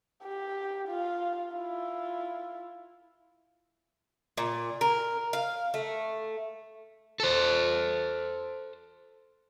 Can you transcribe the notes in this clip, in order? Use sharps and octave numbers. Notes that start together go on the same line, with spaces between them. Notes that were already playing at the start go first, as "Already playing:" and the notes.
G4
F4 F5
E4 F4
A#2
A#4
F5
A3
A4 C5